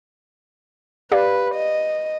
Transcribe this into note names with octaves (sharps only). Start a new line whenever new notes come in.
G4 B4 D5 F5
D#5